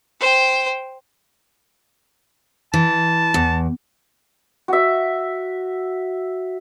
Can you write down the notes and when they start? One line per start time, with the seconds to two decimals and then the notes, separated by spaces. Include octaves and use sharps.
0.21 C5 G5
2.74 E3 A5
3.34 E2
4.68 F#4 E5